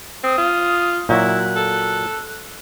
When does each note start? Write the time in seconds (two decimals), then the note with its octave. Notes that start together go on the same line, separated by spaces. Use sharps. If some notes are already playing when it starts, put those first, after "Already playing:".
0.24 C4 D#6
0.38 F4
1.09 A#2 F#3 E4 F#4 F#6
1.56 A4